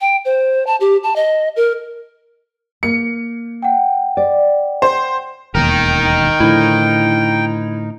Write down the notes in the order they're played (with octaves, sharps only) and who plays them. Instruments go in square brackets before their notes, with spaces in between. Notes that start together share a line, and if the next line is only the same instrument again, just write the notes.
[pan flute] G5
C5
A5
G4
A5
D#5
A#4
[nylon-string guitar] A#3 [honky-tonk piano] C#7
[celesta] F#5 G5
[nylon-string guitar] D5
[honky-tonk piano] C5
[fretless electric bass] E1 D#2 [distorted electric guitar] D#4 A#4 [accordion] G5
[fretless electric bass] A2 D3 F3 [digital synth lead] E4